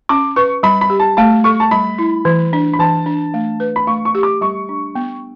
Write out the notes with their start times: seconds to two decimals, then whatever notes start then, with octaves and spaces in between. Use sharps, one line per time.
0.09 C#4 D6
0.36 B4 C#6
0.63 G3 B5
0.81 B5
0.90 G4
1.00 A5
1.17 A3 A5
1.44 A4 C#6
1.60 A5
1.71 G3 B5
1.99 E4
2.25 E3
2.53 D4
2.73 B5
2.79 E3 A5
3.06 D4
3.34 A3
3.60 B4
3.76 B5
3.87 A3 C#6
4.05 C#6
4.15 G4
4.23 D6
4.41 G3 C#6
4.69 D4
4.95 B3